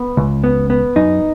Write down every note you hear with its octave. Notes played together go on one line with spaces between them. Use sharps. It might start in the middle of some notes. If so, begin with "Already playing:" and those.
Already playing: B3
C#2
B3
B3
F#2 D#4